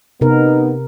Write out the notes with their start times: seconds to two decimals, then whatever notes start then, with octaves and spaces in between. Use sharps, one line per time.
0.21 C3 B3 D#4 A#4